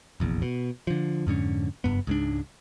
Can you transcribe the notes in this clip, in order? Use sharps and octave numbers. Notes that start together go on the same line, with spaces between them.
F1 A#1 E2
B2
D3 F3
F2 G#2 D3 C#4
F#1 G2 B3
C#2 G#2 D4